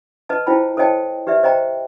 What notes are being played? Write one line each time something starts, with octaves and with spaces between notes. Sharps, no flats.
B4 D#5 A5
E4 F4 C5 G5 A5 B5
A4 C5 C#5 D#5 G5 A5
G4 B4 D5 E5
C5 D#5 G5 A#5